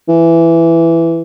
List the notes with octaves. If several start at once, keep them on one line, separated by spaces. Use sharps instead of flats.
E3